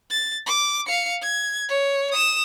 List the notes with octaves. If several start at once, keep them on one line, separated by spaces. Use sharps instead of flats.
A6
D6
F5 C#7
G#6
C#5
D#6 E7